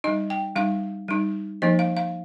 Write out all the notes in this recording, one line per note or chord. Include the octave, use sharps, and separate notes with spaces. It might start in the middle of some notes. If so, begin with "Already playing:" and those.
G3 D#4 D#5
G5
G3 D#4 F5
G3 D#4
F3 A#3 D#4 D#5
F5
F5